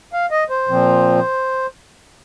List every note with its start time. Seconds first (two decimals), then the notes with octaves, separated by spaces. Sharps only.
0.13 F5
0.31 D#5
0.50 C5
0.68 A#2 F3 C4